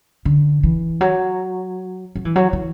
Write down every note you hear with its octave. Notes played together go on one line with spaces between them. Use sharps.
D3
E3
F#3
F#3
E3
F#3
E3